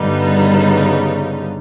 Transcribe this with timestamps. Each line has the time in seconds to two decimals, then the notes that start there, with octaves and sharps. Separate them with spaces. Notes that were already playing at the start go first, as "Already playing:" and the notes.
Already playing: G2 D3 G3 B3 D#4
0.25 C#3